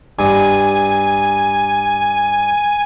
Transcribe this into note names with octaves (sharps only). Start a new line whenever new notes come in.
G2 G#5